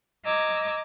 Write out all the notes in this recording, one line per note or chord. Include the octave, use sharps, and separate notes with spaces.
D#5 A#5 D6 E6 G#6